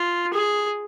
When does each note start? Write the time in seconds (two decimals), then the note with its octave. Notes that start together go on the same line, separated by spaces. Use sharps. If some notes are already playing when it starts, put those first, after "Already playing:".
Already playing: F4
0.34 G#4